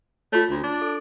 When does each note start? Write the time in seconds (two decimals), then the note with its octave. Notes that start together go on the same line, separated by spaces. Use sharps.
0.33 A3 F4 C#5
0.50 D2
0.63 D4
0.82 A4